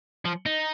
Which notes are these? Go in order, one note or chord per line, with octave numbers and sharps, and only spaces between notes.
F3
D#4